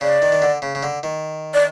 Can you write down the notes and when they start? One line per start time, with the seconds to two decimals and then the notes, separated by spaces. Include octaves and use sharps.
0.01 C#3 D5
0.22 D#3
0.32 D#3
0.42 D3
0.62 C#3
0.75 C#3
0.83 D3
1.03 D#3
1.54 D5